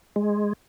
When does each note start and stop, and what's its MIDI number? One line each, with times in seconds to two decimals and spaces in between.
0.16 0.53 56